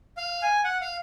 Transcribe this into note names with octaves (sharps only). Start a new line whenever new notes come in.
F5
G#5
F#5
F5